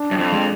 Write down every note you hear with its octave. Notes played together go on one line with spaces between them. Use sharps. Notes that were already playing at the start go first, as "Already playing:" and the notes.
Already playing: D4
F#2
F2
G#3